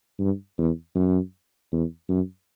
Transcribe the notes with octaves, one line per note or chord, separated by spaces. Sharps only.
G2
E2
F#2
E2
F#2